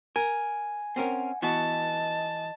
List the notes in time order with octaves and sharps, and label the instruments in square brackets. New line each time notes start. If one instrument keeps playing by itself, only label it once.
[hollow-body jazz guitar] A#4 [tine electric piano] G#5
[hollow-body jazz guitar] C4 C#4 A#4 [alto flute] F#5
[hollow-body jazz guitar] E3 B3 F#4 [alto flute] D#5 [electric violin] A5